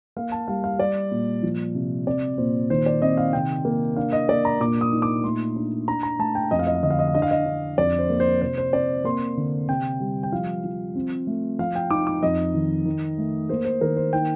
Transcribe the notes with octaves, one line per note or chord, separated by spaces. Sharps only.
A#3 F5
A5
G3 F5
F5
G3 D5
A#2
F3
C3
C4 D5
A#2 C5
D#3 C5
D5
C4 D#5
F5
C3 G5
A#3
D4 F5
D#5
A#3 D5
A#5
A#2 D6
D#6
D#4
D6
A3 C6
D4
D4 A#5
A#5
A3 A5
G5
F2 D#5
F5
D#5
F5
D3 D#5
F5
D#5
F5
D4 D#5
F5
D#5
D4
F2 D5
C5
A#3
C5
C3 C5
C5
C4 D5
A#3 C6
D3
C3 G5
G3
G5
F3 F5
F3
C4
A3
F3 F5
G5
D#4 D6
D6
F2 D#5
D#3
D#3
A3
A#3 C5
C5
D#3 A#4
C5
D#4 G5